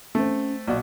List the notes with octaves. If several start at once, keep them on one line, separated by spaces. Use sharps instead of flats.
A3 C4 C#4
B1 A#2 F#4 D5